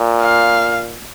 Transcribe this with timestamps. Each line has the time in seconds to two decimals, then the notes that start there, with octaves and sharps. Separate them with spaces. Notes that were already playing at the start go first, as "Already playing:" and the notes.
Already playing: A#2
0.22 F5